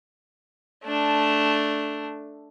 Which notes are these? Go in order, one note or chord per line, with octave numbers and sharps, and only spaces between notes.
A3 D4